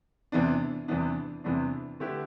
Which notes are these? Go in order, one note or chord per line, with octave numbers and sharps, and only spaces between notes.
E2 C3 E3 B3 D4
E2 C3 E3 B3 D4
E2 C3 E3 B3 D4
D3 A3 E4 G4 B4